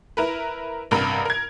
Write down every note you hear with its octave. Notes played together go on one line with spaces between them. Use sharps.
E4 A#4 B4
A1 G2 C3 A#4
A#4 G#6